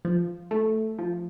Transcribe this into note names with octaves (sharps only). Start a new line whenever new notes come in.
F3
A3
F3